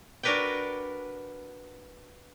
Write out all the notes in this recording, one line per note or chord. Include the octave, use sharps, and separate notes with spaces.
D4 F#4 A#4 B4 D5 G5